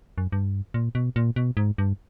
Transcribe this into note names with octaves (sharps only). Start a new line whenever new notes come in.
F#2
G2
A#2
B2
A#2
B2
G#2
G2